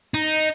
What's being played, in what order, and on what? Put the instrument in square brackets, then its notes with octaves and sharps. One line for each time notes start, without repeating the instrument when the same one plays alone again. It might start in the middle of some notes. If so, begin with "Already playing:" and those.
[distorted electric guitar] D#4